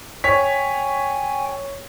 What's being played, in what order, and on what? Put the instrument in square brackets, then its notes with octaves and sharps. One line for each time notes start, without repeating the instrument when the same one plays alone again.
[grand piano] C#5 B6 [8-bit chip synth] G5 G#5